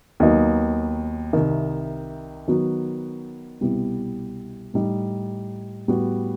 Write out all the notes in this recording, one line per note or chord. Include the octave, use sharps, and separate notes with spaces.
D#2 D#3 F#3 B3 D#4
C2 C3 D#3
D#3 F#3 B3 F#4
C2 B2 G3 B3 E4
A2 G3 D#4
A2 G3 B3 F#4